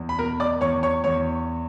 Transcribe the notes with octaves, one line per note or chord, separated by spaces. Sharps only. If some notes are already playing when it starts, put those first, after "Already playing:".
Already playing: E2
B5
B2 A#4 A#5
D5 D6
E2 C#5 C#6
C#5 C#6
E2 C#5 C#6